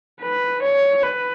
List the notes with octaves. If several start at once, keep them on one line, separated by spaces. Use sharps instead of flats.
B4
C#5
B4